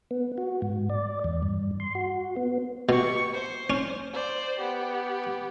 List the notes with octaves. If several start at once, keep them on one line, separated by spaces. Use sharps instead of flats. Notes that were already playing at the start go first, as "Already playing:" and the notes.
B3
F#4
G#2
D5
E2
G2
C6
F#4
B3
B2 G4 C#6
C5
C#4
C5 D5
B3 G4